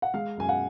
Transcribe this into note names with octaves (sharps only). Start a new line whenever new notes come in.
F#5
G#3 F5
F#2 G#5
F#5